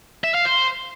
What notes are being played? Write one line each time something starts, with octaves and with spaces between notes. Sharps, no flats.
E5
F5
C5